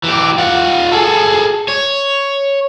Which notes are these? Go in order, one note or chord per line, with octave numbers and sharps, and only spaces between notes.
E3 G4
F4 F#5
G#4 A4
C#5